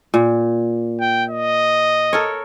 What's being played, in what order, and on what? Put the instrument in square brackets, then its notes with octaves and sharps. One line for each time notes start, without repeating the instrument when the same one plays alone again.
[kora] A#2
[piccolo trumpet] G5
D#5
[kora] A4 A#4 C#5